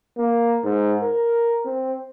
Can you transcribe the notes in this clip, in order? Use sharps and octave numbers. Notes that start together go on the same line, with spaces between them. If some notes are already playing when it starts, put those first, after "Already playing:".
A#3
G#2
A#4
C4